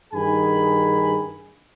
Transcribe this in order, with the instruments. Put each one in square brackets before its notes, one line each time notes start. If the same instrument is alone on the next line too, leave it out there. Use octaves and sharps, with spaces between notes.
[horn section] G2 D#3 G#4 G#5 B5